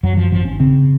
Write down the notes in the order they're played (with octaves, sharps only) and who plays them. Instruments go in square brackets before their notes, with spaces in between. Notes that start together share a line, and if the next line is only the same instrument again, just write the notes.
[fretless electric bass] F#2 F#3
F3
G#1 F3
C#4
C#3 C4